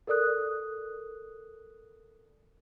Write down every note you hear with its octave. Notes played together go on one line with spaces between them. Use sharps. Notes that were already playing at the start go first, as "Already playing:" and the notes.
A4 A#4 D5 D#6 F#6